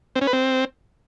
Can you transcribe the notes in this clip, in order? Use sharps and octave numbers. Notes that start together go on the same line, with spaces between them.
C4
C#4
B4
C4